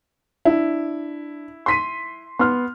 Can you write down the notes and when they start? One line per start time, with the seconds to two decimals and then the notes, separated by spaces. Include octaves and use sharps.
0.45 D4 E4
1.66 C6 B6 D#7
2.39 B3 C6 F6